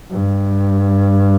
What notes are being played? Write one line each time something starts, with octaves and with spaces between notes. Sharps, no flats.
G2